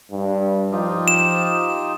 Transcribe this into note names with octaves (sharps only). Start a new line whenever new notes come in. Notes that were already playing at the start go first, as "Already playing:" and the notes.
G2
F3 D#4 F4 G4
E7